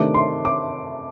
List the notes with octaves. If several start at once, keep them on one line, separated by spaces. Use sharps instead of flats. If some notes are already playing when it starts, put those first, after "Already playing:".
Already playing: C3 D#3 A3 D4 D6
C6
D6